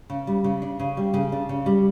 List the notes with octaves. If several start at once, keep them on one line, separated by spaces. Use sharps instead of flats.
C#3
G3
C#3
D4
C#3
G3
C#3
D4
C#3
G3